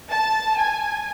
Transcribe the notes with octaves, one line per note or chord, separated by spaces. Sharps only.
A5
G#5